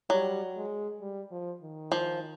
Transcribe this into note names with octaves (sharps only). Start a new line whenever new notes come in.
F#3 G3
G#3
G3
F3
D#3
F3